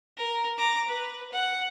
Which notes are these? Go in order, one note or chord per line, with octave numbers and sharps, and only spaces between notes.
A#4
A#5 D6
B4
F#5